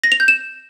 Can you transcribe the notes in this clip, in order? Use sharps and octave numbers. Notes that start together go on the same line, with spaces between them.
A#6
F7
G6
E7